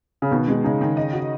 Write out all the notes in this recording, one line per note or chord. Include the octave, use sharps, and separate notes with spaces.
C#3
B2 D#3
G#3
C#3 D#4
D#3
D#5
F#4